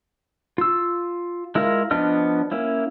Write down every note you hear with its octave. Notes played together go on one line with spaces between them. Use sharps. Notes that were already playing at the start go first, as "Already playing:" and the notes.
F4 E6
G#3 E4 F4 A#4 F5
F3 B3 D4 D#5 F6
A#3 C#4 E4